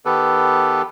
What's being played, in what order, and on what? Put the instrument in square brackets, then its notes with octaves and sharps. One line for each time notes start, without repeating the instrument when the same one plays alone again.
[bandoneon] D#3 B3 G4 A4 B4